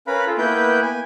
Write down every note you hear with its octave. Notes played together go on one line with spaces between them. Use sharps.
C#4 A#4 B4 F5 B5
F4 A4
A#3 B3 E4 B4 G5 G6
G#5